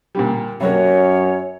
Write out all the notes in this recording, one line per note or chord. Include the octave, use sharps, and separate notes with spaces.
A#2 D3 G3
F#2 C3 F#3 A#3 C#5